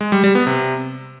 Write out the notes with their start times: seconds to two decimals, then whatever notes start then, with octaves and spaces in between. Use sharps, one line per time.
0.01 G#3
0.12 G3
0.24 G3
0.35 B3
0.47 C3